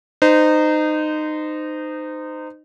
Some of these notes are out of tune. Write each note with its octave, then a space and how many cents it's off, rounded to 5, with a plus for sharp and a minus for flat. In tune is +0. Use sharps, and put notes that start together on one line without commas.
D#4 -20 C5 -25